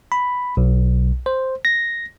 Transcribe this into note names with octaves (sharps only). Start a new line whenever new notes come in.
B5
B1
C5
A#6